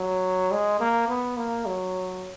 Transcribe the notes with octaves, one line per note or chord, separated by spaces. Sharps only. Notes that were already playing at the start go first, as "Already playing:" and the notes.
Already playing: F#3
G#3
A#3
B3
A#3
F#3